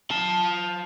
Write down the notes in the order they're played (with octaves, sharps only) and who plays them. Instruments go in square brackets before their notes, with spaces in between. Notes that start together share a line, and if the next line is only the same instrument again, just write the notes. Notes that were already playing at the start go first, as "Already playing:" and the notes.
[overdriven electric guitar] F4 A5